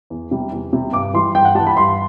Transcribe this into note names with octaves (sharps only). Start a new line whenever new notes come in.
E2
C3 G3
E2
C3 G3
G2 D6
E3 G3 C6
G2 G5
F#5
E3 G3 A5
B5
G2 C6